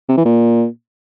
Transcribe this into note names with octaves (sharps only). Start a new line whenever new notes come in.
C3
E3
A#2